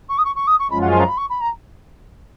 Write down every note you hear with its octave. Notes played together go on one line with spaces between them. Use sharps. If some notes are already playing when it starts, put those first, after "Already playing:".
C#6
D#6
C#6
C#6
D#6
C#6
F#2 F3 G#3 C#4 F4 B5
F#5
G#5
A#5
B5
C#6
B5
A#5